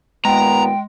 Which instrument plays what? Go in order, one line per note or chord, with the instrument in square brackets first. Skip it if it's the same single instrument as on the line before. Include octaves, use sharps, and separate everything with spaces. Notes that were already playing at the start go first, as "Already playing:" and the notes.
[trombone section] D#2 A#2 B3 [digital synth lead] G#3 [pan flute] G5 [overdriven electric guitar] A#5